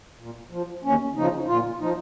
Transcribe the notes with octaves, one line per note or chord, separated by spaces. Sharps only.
A#2
F3
D#2 C#4
C#3 F3 D#4
A#2 F4
F3 D#4